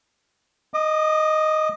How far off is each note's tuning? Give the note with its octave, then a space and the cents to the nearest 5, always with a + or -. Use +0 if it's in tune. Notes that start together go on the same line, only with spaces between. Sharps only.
D#5 +0 D6 +45